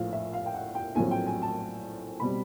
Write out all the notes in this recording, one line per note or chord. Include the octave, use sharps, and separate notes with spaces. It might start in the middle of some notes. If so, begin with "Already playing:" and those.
Already playing: A#1 A2 F3 F5
E5
F5
G5
F#5
G5
A#1 A2 F#3 A3 C4 G#5
G5
G#5
A5
B2 G3 C4 B5